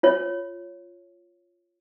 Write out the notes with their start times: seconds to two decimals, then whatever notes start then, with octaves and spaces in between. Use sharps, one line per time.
0.03 F4 C#5